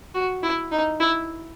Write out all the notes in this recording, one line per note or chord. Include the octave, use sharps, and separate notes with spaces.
F#4
E4
D#4
E4